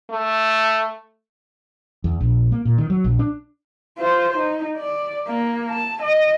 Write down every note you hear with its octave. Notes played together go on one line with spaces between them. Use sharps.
A3
E2
A#1
A#3
A#2
D#3
F#3
A#1
D4
F4 C5
D#4
D5
A#3
A5
D#5